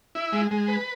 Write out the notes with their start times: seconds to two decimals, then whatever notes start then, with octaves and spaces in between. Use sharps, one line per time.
0.15 E4
0.32 G#3
0.51 G#3
0.68 B4